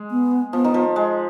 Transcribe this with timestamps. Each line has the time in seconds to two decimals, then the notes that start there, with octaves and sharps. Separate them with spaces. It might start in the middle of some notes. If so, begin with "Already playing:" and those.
Already playing: G#3
0.11 B3
0.53 F3 B3
0.64 D#3
0.74 F3
0.96 G#3